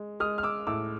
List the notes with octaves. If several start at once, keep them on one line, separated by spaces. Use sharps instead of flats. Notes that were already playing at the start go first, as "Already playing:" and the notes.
Already playing: G#3
G#3 D#6 F6
F6
D6 E6
A2 D6 E6